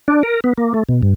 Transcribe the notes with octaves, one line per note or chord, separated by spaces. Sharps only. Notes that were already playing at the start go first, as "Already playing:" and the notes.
D4
A#4
B3
A#3
A3
B2
G2